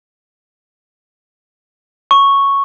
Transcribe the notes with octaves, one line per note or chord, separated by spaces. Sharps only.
C#6